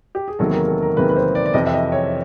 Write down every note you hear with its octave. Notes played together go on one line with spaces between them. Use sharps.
G4
G#4
E2 C3 D#3 F#3 A#3 A4
A#4
A4
A#4
E2 C3 D#3 F#3 A#3 B4
B4
C5
D5
D5
F2 C3 E3 D#5
E5
D#5
C#5